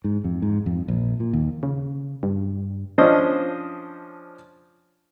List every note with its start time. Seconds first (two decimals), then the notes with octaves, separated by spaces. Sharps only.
0.04 G#2
0.24 F2
0.42 G#2
0.66 F2
0.88 A#1
1.20 A#2
1.33 D#2
1.63 C#3
2.23 G2
2.98 F3 C#4 D4 C5 D#5 D#6